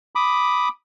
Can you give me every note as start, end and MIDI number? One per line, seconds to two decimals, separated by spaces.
0.15 0.69 83
0.15 0.69 86
0.15 0.69 87